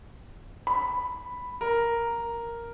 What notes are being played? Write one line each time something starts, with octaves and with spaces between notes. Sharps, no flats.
B5
A#4